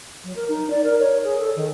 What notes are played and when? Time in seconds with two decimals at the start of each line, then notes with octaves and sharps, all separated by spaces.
0.24 F#3
0.35 A#4
0.48 D#4
0.70 D5
0.83 A#4
0.99 C#5
1.24 G#4
1.39 A4
1.56 D#3